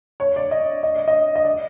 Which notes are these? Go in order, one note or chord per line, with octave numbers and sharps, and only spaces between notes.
C#5
D5
D#5
D#5
D5
D#5
D#5
D5